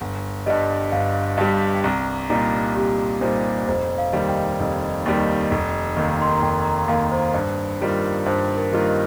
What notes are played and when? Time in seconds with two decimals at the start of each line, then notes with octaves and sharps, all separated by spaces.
0.01 G1
0.46 G2 G3 D#5
0.92 G1 F5
1.37 G2 G3 G5
1.74 G5
1.84 C2 A#5
2.30 A#2 G3 D#4 A#5
2.76 C2 G4
3.21 A#2 G3 D#4 C5
3.67 F1 C5
3.98 F5
4.13 D#2 D#3 G3
4.29 G5
4.60 F1
5.06 D#2 D#3 G3
5.51 F1
5.96 D#2 D#3 A#3
6.22 C6
6.32 A#5
6.42 F1 G5
6.65 A#5
6.88 D#2 D#3 A#3 F5
7.11 C5
7.34 G2
7.81 D#3 G3 A#3 F4
8.26 G2 C5
8.57 A#4
8.72 D#3 G3 A#3 F4
8.87 D#5